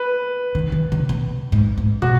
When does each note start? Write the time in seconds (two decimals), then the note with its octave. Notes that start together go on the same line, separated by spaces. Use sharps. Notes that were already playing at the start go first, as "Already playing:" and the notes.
Already playing: B4
0.55 D#3
0.72 D#3
0.92 C#3
1.09 B2
1.52 G#2
1.78 G#2
2.02 B2 F#4